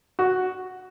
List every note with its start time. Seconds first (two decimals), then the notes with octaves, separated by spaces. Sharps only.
0.19 F#4